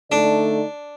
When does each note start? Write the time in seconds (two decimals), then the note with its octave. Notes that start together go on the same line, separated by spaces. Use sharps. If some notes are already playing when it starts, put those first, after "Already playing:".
0.12 D3 A3 D4 D#4 A4 D5